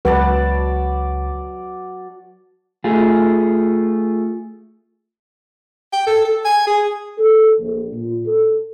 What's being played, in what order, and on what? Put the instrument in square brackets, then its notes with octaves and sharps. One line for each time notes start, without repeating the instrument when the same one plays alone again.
[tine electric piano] C#2 [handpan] F#3 B4 [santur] F#4 D5 A5
[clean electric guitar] A3 F4 G#4
[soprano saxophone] G5
A4
A4
G#5
G#4
[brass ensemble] A4
A#1
A#2
A4